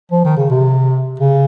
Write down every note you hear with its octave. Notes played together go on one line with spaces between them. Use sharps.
F3
D#3
C#3
C3
C#3